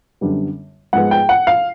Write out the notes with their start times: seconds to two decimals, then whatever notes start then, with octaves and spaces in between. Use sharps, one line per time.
0.21 F#2 D3 G3 B3
0.93 G#2 F3 G#3 B3 F#5
1.11 G5
1.29 F#5
1.47 F5